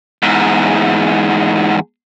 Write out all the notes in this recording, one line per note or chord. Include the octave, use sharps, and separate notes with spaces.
E2 G#2